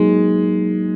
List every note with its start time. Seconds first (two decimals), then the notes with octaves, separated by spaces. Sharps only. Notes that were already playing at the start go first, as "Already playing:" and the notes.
Already playing: F#3 G#3 A#3 D#4